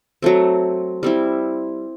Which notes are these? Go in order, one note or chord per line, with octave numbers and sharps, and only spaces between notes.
F#3 A3 C4
G3 C4 E4